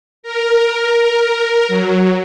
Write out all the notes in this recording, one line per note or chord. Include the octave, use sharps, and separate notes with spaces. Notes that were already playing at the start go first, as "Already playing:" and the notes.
A#4
F#3